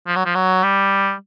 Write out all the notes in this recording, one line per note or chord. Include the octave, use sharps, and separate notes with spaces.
F3
F#3
F3
F#3
G3